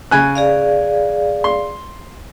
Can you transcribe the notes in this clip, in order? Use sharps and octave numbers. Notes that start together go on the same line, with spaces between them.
C#3 G#5 F#6
G#4 D5 F5
C6